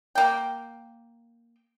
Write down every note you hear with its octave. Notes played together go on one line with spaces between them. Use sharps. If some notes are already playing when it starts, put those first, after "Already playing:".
A#3 G5